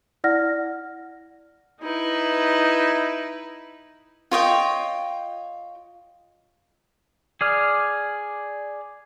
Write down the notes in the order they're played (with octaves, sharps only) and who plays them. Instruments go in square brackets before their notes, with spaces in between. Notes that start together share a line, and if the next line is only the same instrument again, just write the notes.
[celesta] E4 D5 F#5 F6 A#6
[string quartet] D#4 E4 B4
[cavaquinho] F4 C#5 D#5 G5
[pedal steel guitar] G#4 D5 F6